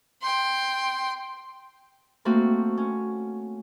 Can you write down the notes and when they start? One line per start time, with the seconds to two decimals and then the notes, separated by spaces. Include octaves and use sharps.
0.22 G5 C6
2.25 A3 A#3 C4 F#4
2.77 C#4